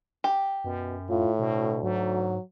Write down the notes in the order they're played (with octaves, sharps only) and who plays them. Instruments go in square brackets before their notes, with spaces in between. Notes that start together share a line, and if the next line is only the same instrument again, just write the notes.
[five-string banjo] G4
[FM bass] F#2 [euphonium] B2
[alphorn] A2 [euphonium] F4
[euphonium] D2 [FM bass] B2
[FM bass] G#2 [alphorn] F#3